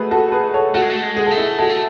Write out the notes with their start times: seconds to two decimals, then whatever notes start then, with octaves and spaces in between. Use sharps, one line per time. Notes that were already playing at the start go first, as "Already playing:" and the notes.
Already playing: A3 F#4 G#4 B4
0.11 F#4 A4
0.32 G#4 B4
0.54 A4 C#5
0.74 A3 F#4 A4
0.82 G#3
0.90 A3
1.03 G#3
1.17 G#4
1.26 A3 A4
1.38 E4 G#4
1.58 G#3 F#4 A4
1.70 A3